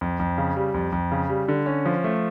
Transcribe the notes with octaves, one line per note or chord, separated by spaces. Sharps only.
F2
F2
C#3
G3
F2
F2
C#3
G3
D3
C#4
F3
A3